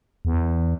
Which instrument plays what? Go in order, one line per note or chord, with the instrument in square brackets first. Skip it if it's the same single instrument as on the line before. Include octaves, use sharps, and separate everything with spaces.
[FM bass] E2